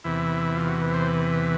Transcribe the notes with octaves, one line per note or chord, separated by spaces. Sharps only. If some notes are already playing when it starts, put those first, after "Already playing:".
E2 C3 E3 E4
F4
F#4
B4
C5
B4